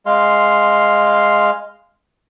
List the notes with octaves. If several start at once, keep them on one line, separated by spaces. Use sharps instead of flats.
G#3 F5 C6